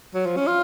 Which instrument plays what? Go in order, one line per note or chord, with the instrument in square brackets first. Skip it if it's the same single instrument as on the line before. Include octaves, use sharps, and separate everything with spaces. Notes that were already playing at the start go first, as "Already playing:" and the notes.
[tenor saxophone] F#3
F3
C#4
F4